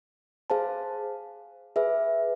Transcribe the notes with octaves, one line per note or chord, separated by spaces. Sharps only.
G#4 C5 F5 A5
G#4 B4 E5